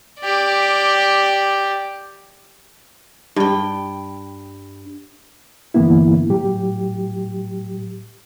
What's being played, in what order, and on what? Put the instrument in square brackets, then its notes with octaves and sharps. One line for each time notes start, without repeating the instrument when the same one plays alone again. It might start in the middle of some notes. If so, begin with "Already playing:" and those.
[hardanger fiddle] G4 D5
[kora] G2 G5
[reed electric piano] G2 D3 E3 A#3 B3 E4
A2 F#3 G4